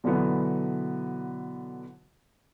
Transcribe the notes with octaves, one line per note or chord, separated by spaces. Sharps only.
B2 D3 E3 F#3 B3